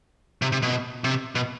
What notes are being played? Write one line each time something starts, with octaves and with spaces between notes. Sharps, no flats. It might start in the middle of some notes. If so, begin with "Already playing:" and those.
C3
C3
B2
C3
B2